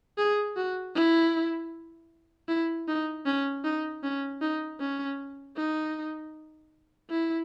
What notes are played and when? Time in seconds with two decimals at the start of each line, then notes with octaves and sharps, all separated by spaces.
0.18 G#4
0.57 F#4
0.95 E4
2.48 E4
2.88 D#4
3.26 C#4
3.64 D#4
4.03 C#4
4.41 D#4
4.80 C#4
5.57 D#4
7.10 E4